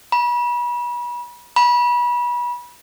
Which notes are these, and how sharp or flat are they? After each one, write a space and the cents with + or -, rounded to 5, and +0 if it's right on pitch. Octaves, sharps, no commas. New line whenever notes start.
B5 -35
B5 -30